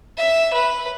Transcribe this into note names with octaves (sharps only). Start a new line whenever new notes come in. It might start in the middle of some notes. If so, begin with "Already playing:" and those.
E5
B4